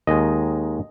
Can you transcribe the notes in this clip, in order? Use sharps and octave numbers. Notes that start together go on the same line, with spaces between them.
D#2 D#3 G#3 D#5